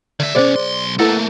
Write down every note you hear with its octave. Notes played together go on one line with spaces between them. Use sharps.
D3 D5 E5
B2 C#4 G#4 C5 D5
B1 C6
A3 A#3 E4 A4 B4 F#5